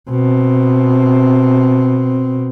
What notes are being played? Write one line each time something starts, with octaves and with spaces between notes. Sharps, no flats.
B2 C4